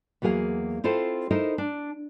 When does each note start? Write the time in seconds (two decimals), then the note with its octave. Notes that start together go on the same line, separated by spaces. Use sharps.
0.22 E2 F#3 A#3 G#4 F5
0.84 C4 E4 F4 A4 C5
1.31 D#4 E4 A4 A#4 C5 D#5
1.58 D4